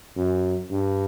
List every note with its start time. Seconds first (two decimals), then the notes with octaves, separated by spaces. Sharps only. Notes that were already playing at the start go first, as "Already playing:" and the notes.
0.17 F#2
0.71 G2